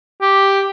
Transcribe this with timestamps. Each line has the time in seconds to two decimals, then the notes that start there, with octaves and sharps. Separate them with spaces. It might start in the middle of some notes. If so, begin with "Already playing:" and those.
0.21 G4